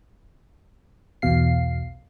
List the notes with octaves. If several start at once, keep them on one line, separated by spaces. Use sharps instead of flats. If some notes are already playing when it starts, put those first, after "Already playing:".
B1 E2 B2 F5 C7